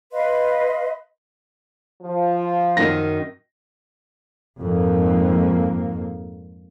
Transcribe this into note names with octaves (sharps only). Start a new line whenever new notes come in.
B4 D#5 F5 C6
F3
F#2 D#3 C#4 A#6
F2 G#2 A#3